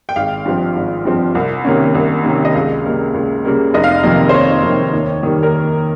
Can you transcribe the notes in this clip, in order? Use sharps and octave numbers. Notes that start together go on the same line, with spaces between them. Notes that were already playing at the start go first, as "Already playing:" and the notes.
G5
G#1 F5
G2 F3 C4
G#1
G2 F3 C4
C2
C3 D#3 A#3 C#4
C2
C3 D#3 A#3 C#4
D#5
C#2 F5
C#3 G3 A#3
C#2
C#3 G3 A#3
F1 D#5
F5
D#5
F2 C3 D#3 A#3 D#5
C5
F1 C#5
F2 C3 D#3 A#3
D#2
D#3 G3 A#3
A#4